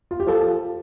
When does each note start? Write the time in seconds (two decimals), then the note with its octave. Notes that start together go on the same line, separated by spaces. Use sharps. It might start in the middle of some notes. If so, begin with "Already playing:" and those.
0.11 F4
0.20 G4
0.26 F3 A4